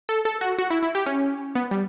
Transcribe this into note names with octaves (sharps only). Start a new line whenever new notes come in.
A4
A4
F#4
F#4
E4
E4
G4
C#4
B3
G3